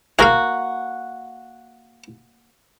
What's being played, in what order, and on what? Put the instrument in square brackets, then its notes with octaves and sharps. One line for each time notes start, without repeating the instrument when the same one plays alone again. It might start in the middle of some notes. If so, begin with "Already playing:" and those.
[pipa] A#3 F#4 [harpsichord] G#4 A#4 F5